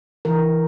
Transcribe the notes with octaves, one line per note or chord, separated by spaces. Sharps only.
E3 A#4